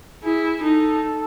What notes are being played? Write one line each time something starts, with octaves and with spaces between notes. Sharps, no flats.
E4 G#4
D#4 A4